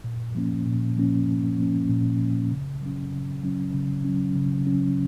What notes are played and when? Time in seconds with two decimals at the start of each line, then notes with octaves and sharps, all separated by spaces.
0.04 A#2
0.35 F3 A#3 C#4
0.66 A#2
0.97 F3 A#3 C#4
1.28 A#2
1.58 F3 A#3 C#4
1.89 A#2
2.20 F3 A#3 C#4
2.51 C#3
2.82 F#3 C#4
3.13 C#3
3.43 F#3 C#4
3.74 C#3
4.05 F#3 C#4
4.36 C#3
4.67 F#3 C#4